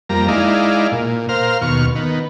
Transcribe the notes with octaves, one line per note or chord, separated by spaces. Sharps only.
F2 G3 A#3 A#5
G#3 D#4 E4 D5 F5
A#2
A#4 C5 F5 F6
D#2 B2 C#6 F6
D#3 B3